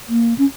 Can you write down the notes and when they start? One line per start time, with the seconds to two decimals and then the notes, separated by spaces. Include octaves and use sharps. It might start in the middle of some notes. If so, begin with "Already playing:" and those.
0.09 A#3
0.38 C#4